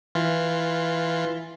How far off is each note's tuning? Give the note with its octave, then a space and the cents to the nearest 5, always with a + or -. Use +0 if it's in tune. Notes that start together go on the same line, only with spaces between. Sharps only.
E3 +0 F4 +0